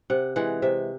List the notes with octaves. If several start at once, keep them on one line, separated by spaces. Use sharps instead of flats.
C3 F#5
E3 G#3 F#5
C3 E5